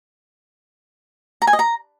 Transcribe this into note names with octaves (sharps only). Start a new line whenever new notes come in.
A#5
G#5
D#5
A#5